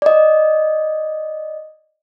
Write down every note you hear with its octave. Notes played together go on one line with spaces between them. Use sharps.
D5 D#5